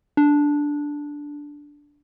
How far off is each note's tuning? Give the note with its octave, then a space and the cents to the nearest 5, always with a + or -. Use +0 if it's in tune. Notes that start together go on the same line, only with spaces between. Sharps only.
D4 -5